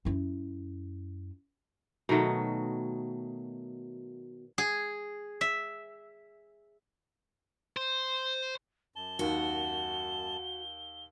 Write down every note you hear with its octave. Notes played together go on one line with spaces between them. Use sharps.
F#2 E4
B2 D#3 F#3 A3
G#4
E5
C5
F#2 A5 G7
D#2 D#3 F#4